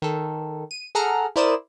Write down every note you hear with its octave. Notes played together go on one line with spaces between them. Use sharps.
D#3 A4
D#7
G#4 A4 F#5 A#5 F6
E4 A#4 C5 D5 D#6 E7